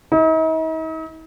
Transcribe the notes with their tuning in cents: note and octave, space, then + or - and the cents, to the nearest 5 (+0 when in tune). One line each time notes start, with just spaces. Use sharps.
D#4 +45